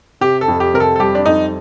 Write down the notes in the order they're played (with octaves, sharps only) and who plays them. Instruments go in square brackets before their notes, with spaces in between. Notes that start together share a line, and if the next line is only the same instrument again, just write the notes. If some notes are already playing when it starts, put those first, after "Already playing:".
[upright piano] C3 [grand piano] G4
[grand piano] A4
[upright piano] F2
[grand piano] G4
[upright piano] C3 [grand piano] A#4
[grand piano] A4
A4
[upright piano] G3 [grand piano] G4
[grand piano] D4
[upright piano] F2 [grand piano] D#4